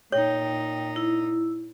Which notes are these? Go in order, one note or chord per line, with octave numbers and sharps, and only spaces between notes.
A#2 D#4 C#5 G5
E4